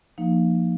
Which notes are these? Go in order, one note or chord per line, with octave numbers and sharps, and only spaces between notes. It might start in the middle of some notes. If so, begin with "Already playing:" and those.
F3 A#3 D#4